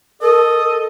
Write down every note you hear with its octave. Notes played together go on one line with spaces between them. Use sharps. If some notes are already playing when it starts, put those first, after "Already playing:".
A4 A#4 D#5